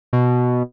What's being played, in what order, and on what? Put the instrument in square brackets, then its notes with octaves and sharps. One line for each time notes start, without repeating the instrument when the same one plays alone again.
[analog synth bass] B2